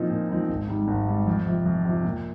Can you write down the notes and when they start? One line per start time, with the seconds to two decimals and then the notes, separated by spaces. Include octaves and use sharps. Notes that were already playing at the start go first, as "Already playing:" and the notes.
Already playing: A#2 F3 C4 D#4
0.10 A#2
0.29 F3 C4 D#4
0.49 G#1
0.68 G#2 G3
0.88 G#1
1.07 G#2 G3
1.27 F2
1.46 C3 F3
1.66 F2
1.85 C3 F3
2.05 A#2